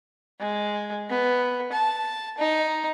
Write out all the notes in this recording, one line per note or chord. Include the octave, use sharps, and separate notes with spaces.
G#3
B3
A5
D#4